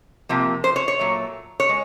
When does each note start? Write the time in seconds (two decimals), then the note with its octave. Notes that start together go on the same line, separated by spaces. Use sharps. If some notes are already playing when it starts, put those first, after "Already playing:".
0.29 C3 F3 A#3
0.64 C5
0.76 C#5
0.88 C#5
0.99 A#2 F#3 A3
1.60 C#5
1.69 G#3